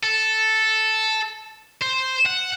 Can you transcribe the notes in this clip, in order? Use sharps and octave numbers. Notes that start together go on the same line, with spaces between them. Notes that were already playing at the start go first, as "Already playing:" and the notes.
A4
C5
F#5